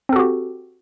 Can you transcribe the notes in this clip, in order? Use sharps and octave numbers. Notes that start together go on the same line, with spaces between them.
C4 F#4 G4 A4